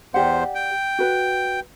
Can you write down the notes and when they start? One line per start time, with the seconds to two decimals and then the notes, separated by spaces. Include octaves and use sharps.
0.14 E2 G4 C5 D5 F#5
0.55 G5
0.99 F#4 B4